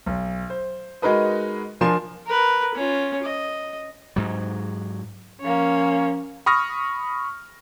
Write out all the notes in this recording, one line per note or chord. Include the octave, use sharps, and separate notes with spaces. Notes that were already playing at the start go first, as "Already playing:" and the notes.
B1
C5
G#3 D#4 F#4 A#4 B4 D#5
F3 D4 A#4 G#5 C6 E7
A#4 B4
C#4 F4
D#5
G#2 F#3
F3 A#3 C#4 C#5
B5 C#6 D#6 F6 A#6